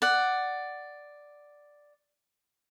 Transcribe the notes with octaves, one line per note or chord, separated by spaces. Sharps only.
D5 F#5